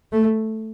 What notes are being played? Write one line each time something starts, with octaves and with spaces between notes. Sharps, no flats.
A3